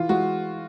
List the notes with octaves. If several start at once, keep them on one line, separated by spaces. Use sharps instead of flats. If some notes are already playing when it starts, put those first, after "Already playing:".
Already playing: E3 F4
G#3 F#4